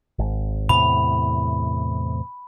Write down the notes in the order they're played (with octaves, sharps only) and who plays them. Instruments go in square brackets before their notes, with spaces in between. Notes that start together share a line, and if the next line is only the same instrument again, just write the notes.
[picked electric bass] G#1
[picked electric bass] E2 A2 C3 [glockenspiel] B5